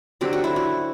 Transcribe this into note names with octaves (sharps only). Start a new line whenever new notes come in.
D3 F#3 C4 G4
F#4
E4
F#4